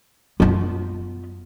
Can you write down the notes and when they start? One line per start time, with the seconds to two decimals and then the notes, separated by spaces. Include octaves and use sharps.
0.40 F#2 B3 F4